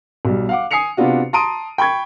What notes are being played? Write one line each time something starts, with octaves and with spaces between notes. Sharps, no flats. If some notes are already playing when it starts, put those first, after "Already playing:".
B1 G3
F5 F#5 D6
G#5 D#6 C7 C#7 F7
C3 B3 D4 F4 F#4
A5 A#5 C6 D#6 D7 D#7
G5 B5 C#6 G#6